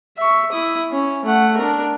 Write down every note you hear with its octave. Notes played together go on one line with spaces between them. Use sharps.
E5 C#6
E4 D#6
C#4
A3 F#5
D4 A#4